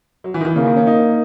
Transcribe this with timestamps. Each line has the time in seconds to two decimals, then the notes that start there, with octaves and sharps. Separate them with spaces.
0.24 F#3
0.34 E3
0.41 D#3
0.45 E3
0.55 C#3 A#3
0.66 D#3
0.76 C#4
0.87 D#4